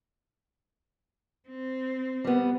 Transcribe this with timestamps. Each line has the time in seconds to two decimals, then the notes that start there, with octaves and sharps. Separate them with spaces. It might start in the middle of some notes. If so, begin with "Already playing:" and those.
1.49 C4
2.24 G3 B3